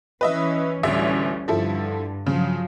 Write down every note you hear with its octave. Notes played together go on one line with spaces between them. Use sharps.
E3 C#4 B4 D#5 E5
A1 D2 E3 G3 C#4 E5
G2 D3 F3 E4 A4
C#3 F3 F#3